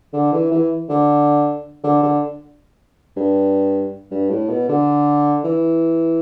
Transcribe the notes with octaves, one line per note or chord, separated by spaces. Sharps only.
D3
E3
E3
D3
D3
D3
G2
G2
A2
B2
D3
E3